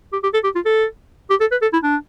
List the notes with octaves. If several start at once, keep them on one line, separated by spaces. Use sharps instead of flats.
G4
G4
A4
G4
F4
A4
G4
A4
B4
A4
E4
D4